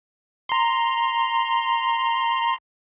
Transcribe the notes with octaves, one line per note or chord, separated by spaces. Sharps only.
A#5 C6